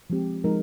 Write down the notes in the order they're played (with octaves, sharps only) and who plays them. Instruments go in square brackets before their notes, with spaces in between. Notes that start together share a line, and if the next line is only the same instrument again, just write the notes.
[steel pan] F3 G#3 C4 G4
F3 G#3 D#4 A#4